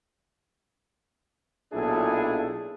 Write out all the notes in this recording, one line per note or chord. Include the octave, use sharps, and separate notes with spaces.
B1 A#2 D4 E4 G#4 A4